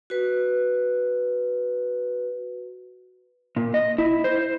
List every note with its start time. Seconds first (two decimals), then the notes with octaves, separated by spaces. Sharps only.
0.10 F#4 B4
3.56 A#2
3.74 D#5
3.98 E4
4.24 C5